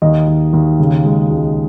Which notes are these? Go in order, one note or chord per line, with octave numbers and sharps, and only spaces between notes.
D#2 D#5
D#2
D#2
C#3
G#3
C#2